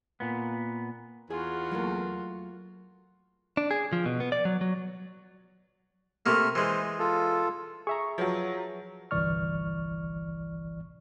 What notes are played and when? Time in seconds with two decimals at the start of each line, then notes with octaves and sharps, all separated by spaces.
0.20 A#2 B3
1.30 E2 F4 F#4 G#4
1.72 F#3 A3 A#3
3.57 D4
3.71 G#4
3.93 F3
4.06 B2
4.20 B3
4.32 D5
4.45 F#3
4.61 F#3
6.26 C3 A3 A#3 F6
6.55 E3 G#3 C5
6.99 F4 A4
7.87 G#4 E5 A#5 C#6
8.18 F3 F#3 B4 C#5 F#5
9.11 G1 C2 E3 D5 C#6 F6